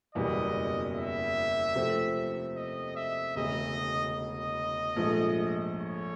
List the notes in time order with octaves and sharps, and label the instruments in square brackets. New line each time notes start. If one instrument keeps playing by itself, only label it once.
[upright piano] F#1 E2 B2 G3 [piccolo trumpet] D#5
[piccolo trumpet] E5
[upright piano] C3 F3 A3 C4
[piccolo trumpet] D#5
E5
[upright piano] E1 D2 C#3 [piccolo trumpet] D#5
[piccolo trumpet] D#5
[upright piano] A#1 G#2 F3 A3
[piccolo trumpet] C#5